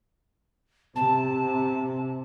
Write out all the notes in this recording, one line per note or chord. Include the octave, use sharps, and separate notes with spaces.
C3 A5